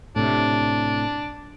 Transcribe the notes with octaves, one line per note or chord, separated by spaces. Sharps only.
A2 C3 D4